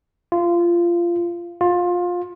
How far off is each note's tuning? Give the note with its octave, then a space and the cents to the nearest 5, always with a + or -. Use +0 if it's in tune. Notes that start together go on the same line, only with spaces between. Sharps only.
F4 -20
F4 +20